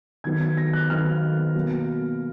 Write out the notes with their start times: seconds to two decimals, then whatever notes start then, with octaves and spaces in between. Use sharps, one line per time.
0.24 D#3 F#3 B3 G#6
0.41 G#6
0.57 A#6
0.73 F#6
0.90 D#3 F#3 B3 F6
1.55 B2 F#3 A#3